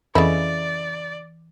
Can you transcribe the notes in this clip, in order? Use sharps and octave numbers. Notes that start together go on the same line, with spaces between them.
F2 C#3 E3 E4 A4 D5 D#5